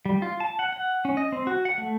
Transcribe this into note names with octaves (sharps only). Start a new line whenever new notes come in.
G3
F4
A5
F#5
F#5
C#4
D#5
C4
F#4
F#5
A3